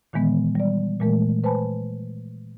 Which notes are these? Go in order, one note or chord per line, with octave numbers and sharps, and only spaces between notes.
A#2 D#3 E3 G#3 B3
G3 D5
A#2 E3 G#3 A3 A#4
B4 C5 G#5 A5 B5